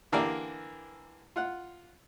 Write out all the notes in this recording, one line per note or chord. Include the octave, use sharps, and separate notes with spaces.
D3 E3 A#3 G4 A#4 D5
F4 F#5